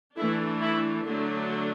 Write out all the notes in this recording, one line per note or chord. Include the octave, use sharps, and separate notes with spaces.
E3 A3 D4 E4
E4
D3 F#3 A3 D4